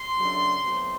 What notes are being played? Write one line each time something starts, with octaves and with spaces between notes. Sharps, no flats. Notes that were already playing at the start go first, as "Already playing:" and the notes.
Already playing: C6
F#2 C#3 F#3 A3 D4
B2 F#3 A3 C4 D#4